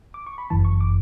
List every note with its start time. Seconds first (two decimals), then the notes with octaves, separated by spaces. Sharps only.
0.14 D6
0.26 C#6
0.38 B5
0.50 G1 F#2 E3 A5
0.65 C#6
0.81 D6